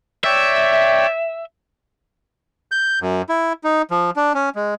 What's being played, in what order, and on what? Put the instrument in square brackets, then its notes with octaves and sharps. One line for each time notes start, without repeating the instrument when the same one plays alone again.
[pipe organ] C#5 D5 G5 [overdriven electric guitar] E5
[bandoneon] G6
F#2
E4
D#4
F3
D4
C#4
G#3